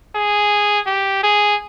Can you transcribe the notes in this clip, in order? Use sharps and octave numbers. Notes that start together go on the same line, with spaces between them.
G#4
G4
G#4